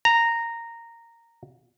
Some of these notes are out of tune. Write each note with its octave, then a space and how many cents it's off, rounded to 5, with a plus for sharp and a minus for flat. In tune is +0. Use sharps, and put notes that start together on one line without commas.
A#5 -10